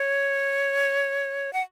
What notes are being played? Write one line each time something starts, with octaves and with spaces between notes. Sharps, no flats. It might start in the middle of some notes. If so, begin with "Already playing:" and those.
Already playing: C#5
F#5